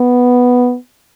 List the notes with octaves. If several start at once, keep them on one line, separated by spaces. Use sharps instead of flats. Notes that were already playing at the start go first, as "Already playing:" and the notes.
Already playing: B3